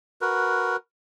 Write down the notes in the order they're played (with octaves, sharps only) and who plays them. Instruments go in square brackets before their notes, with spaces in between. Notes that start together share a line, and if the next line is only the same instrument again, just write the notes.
[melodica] F#4 A#4 B4